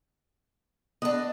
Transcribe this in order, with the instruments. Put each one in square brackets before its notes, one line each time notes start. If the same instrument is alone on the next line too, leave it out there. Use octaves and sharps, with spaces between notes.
[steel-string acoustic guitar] B3 D4 [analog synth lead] D#5